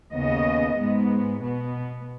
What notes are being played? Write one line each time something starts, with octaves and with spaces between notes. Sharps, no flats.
D#2 C#3 B3 D#5
G#2 G#3 B3
B2 B3